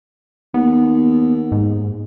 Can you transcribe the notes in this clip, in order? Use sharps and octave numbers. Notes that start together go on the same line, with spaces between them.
D#2 B3
G#2